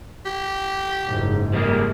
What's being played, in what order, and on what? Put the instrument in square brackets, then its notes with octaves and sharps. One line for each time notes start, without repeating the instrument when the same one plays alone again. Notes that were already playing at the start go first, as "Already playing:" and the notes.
[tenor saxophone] G4
[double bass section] F#1 G#2
[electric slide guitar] G3 G#3 A#3